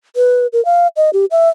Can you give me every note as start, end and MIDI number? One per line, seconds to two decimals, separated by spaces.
0.16 0.47 71
0.53 0.63 70
0.65 0.87 77
0.96 1.10 75
1.13 1.25 67
1.31 1.49 76